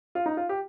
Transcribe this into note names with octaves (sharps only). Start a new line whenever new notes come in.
F4
D#4
F4
G4